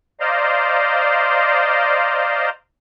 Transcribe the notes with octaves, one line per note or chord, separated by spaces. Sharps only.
C5 D5 D#5 F5 A#5 C6